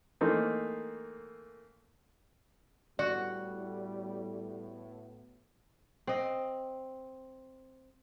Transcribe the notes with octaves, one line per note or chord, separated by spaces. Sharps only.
E3 A3 A#3 C4 D#4
A2 G3 B3 F#4 D5
C4 D#5